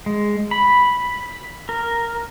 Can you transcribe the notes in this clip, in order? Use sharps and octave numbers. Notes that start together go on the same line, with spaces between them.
G#3
B5
A#4